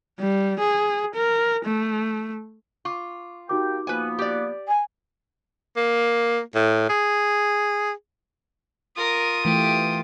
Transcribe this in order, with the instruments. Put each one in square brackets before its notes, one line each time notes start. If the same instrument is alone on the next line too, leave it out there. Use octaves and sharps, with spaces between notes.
[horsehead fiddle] G3
G#4
A#4
A3
[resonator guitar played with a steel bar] F4 [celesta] C#6 D6
[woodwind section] A#3 G4 G5 [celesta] D#4 F#4 D6
[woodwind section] F3 A#3 B3 [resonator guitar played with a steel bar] B4 G#5
[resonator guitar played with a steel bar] G4 D5
[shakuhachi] G#5
[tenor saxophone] A#3
A2
G#4
[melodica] F4 [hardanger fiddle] A#4 [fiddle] D#6
[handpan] E3 A3 [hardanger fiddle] G4